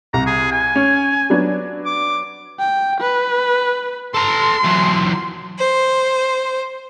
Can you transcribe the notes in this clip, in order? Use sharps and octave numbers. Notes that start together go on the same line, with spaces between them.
C2 A#5
G#4
G#5
C#4
F#3 B3 D4
D6
G5
B4
A4 A#5 C6
E3 F#3
C5